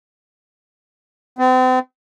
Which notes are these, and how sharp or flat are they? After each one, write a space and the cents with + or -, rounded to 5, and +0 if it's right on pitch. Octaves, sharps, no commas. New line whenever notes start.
C4 -40